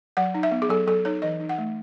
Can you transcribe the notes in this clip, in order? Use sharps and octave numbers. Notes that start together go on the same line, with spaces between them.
F#3 F#5
D#4
E5
B3
G#4
F#3 A4
F#3 A4
D#4 C#5
E3 D#5
D#4
F#5
A3